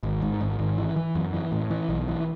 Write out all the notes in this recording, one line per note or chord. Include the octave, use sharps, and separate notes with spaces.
G#1
G#2
G#1
G#1
E3
E3
F#2
E3
A2
E3
B1
E3